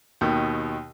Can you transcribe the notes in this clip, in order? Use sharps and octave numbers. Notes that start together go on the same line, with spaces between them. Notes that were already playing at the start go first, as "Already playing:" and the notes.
D#2 B2 D#3